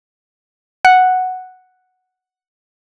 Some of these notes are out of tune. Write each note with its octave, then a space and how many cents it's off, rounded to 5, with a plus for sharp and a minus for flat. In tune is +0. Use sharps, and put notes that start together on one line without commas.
F#5 +0